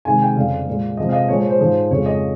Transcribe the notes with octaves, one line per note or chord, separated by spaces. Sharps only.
C3 D#3 G#3 G#5
G5
F2 C#3 G3 F5
A#2 G#3
C3 F3 G#3 D#5
F5
D#5
A#2 F3 G#3 C#5
C#5
C5
G#2 F3 G#3
F2 C#3 F3 G#3 C#5
D#5